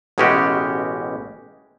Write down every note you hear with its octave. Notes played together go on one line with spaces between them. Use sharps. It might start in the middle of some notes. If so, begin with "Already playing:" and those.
A1 B2 G#3 C#4 F#4 G4